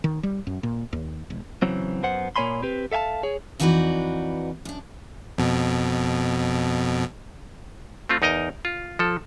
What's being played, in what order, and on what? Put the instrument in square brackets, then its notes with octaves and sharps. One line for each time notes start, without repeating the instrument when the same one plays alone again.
[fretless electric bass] D#3
G3
F#2
A#2
D#2
E1
[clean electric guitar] C#3 E3 F#3 C4
F#2 B3 C5 F#5
A#2 A#3 C#5 G#5 B5 C6
C4 G4 B4
A4 E5 F5 G#5 A5
G#4 C#5
[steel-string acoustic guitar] F2 E3 D#4 F#4 B4 D5
F#2 D4
[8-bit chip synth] F2 B2
[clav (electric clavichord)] A3 C4 F4
E2 D#4 A#4 D#5 A#5
F4
F3 A4